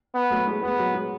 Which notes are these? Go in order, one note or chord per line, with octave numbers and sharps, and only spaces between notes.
B3
F#3 A3
G#3
G#3 B3
F#3
G#3